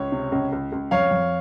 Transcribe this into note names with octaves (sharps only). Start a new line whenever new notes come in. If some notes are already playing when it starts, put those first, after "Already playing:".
Already playing: C#2 C#5
C3
C#2
C#2
C#2
F2 C#5 F5
F2